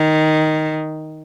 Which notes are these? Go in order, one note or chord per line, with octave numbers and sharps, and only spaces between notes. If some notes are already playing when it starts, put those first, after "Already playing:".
Already playing: D#3